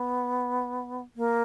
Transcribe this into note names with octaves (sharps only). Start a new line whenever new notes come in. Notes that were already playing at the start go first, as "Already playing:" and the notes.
Already playing: B3
A#3